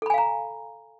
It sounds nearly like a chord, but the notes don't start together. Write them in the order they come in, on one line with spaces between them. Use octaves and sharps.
A4 B5 G#5 F5 A#5